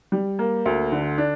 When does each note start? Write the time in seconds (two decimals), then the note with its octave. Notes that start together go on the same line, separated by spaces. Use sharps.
0.12 G3
0.39 A#3
0.66 D2
0.92 D3
1.18 D4